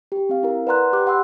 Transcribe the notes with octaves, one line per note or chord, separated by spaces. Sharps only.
G4
C4 F5
E4 A#4
B4 D5 F#5 A#5 C6 F#6
G4 C6 D6 F#6
G4 F#5 B5 C6 E6 F#6